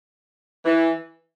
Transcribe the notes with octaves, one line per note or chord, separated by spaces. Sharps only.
E3